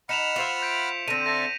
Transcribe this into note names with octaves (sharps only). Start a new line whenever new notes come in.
D#4 F#5 B5 F6 C#7 E7 F7
F4 C5 E5
G6 B6 D7
D3 C4 D#7
A4 E5 A#6